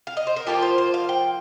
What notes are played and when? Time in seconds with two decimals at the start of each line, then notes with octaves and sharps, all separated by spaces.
0.07 F5
0.17 D#5
0.27 C5
0.36 A#4
0.47 F3 A#3 F4 G4
0.62 C5
0.78 C5
0.94 F5
1.09 G5